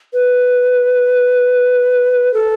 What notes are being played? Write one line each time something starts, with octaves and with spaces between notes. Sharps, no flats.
B4
A4